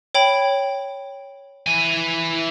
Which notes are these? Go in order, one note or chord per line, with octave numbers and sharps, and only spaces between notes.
C#5 G5 B5
E3 G#5